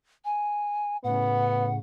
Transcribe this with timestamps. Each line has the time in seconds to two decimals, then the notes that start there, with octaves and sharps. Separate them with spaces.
0.25 G#5
1.04 A2 C#3 B3 F#5